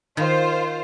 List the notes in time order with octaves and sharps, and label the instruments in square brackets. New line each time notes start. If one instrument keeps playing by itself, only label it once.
[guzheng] D#3 [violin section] F4 C5